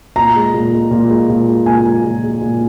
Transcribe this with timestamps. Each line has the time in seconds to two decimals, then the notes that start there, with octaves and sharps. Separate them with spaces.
0.16 A#2 A#5
0.36 G#3
0.54 A#2
0.73 G#3
0.91 A#2
1.10 G#3
1.29 A#2
1.48 G#3
1.66 A#2 G#5
1.85 G#3
2.04 A#2
2.23 G#3
2.41 A#2